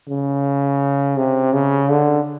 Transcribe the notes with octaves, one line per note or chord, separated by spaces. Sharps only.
C#3
C3
C#3
D3